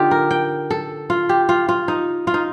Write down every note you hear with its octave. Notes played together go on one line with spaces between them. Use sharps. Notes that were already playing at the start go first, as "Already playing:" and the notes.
Already playing: D3 D#4 F4 G4
A#4
G5
A4
F4
G4
F4
F4
D#4
F4
D#4